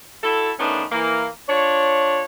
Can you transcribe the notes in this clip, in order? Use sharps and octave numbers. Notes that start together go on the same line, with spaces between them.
E4 F#4 A4
D#3 A3 B3 C#4 D4
E3 A#3
D4 F4 C#5